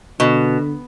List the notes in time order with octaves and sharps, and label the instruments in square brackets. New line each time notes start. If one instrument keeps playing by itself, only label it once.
[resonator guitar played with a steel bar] B2 [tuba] D3